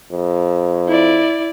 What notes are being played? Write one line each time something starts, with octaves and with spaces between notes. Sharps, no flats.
F2
E4 D5